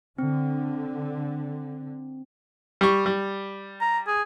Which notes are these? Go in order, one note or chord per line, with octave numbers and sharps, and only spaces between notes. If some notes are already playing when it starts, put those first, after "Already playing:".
D3 C4
G3 C#6
G3
A#5
G#4